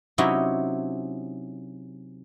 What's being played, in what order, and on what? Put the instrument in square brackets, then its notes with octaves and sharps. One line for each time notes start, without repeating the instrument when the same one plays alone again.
[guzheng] C3 F#3 C#4 D#4 E4